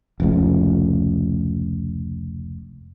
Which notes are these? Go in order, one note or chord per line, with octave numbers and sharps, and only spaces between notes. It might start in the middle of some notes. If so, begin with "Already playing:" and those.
F1 C#2